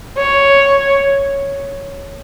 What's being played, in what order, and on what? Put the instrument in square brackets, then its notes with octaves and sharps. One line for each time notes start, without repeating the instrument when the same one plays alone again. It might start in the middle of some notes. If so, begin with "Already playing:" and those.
[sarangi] C#5